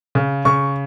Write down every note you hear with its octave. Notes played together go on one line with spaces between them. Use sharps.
C#3
C#3 C#6